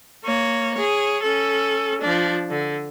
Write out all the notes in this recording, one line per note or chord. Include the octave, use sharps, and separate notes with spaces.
A#3 C#5
G#4 C#5
C#4 A4
F3 D4
D3